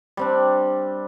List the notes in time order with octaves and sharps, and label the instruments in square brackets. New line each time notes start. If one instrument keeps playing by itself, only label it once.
[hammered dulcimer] G3 C4 D4